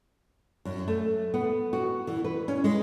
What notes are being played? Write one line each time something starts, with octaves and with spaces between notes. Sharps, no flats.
F#2
A3
B3
F#4
E3
B4
C#4
G#3